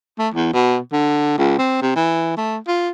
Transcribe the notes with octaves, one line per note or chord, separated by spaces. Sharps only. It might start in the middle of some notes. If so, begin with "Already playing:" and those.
A3
E2
B2
D3
C#2
C4
C3
E3
A3
F4